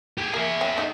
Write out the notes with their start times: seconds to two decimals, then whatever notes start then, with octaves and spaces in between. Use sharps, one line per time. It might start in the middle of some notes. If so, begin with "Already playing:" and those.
0.18 G4 G#4
0.34 A#3 G#4 E5
0.61 C#3 F#3 G5
0.77 A3 D#4 F#4